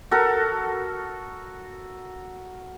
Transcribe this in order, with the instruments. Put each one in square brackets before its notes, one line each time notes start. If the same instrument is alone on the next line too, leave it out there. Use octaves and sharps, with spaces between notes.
[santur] F#4 A4 A#4